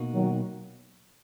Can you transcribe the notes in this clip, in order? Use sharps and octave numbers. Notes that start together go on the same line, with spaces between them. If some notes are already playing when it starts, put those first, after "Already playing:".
Already playing: B2 A#3 D#4 F#4
D#3 F#3